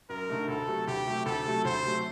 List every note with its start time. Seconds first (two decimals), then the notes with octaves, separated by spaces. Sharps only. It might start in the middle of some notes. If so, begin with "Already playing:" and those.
0.09 F#2 A#4
0.29 D3 A3 D#4
0.48 D2 A4
0.67 C3 F#3 A3
0.87 D2 G4
1.07 C3 F#3 A3
1.26 D2 A4
1.45 C3 F#3 A3
1.65 D2 C5
1.85 C3 F#3 A3